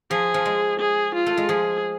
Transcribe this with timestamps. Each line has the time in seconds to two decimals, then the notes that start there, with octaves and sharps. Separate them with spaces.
0.11 F3 G#4
0.34 F3
0.46 G#3
0.79 G#4
1.15 F4
1.26 A3
1.37 G#3
1.49 F3 G#4